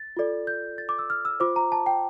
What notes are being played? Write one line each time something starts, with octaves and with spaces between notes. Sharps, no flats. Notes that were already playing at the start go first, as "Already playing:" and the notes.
Already playing: A6
F4 A4 D5
G6
A6
D6
E6
F6
E6
F4 C5 D6
A#5
A5
G5